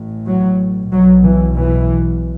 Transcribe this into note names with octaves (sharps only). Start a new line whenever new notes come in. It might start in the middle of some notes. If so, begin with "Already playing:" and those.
Already playing: A1 A2
F#3
B1 B2 F#3
E3
E3